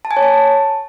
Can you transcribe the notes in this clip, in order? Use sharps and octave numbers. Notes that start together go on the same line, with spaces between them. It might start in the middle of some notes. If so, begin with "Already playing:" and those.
A5
G#5
C#5
A5